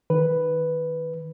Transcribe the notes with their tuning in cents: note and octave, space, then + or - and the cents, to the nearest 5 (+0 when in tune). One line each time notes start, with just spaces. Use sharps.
D#3 +10 B4 +0